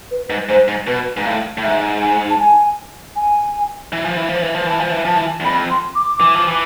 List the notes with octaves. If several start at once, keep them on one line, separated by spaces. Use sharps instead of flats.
B4
G#2
G#2 C5
G#2
B2 B4
G#2
A2 F5
A2
G#2 E5
G#5
A5
G#5
G#5
E3
F3
E3
F3
E3
F3
E3 A5
F3
E3
F3 A5
E3
E2
F2 B5
C6
D6
E3
F3
E3